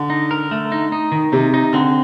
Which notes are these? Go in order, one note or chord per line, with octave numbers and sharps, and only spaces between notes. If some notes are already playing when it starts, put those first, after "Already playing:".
Already playing: D3
D#4
A#4
A3
D#4
D#4
D#3
C3 D#4
D#4
D3 C4